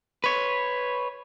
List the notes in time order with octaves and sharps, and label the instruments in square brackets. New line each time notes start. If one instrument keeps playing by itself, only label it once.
[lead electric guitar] B4 C#5